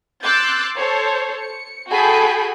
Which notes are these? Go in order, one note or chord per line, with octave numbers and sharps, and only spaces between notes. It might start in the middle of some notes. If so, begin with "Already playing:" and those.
C6 D6 E6 F#6 G6 A6
A4 C5 C#5
C#7
F#4 G#4 A4 G5 B5